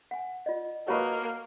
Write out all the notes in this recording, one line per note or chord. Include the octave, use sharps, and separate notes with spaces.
F#5 G#5
F4 D5 D#5
A#3 F#4 B4 C#5 D#5 A5 C#6